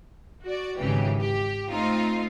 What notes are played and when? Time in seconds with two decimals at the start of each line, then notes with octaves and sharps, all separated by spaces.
0.43 F#4 D5
0.78 G#1 C#3 E3 G4
1.20 G4
1.70 A3 C4 D#4 F4